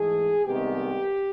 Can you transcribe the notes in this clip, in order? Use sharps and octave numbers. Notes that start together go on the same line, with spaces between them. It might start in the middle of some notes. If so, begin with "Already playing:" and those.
Already playing: G#2 E3 A3 G#4
C2 C3 D#3 G#3 B3 G4